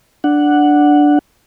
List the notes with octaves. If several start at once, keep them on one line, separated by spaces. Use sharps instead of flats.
D4 F#5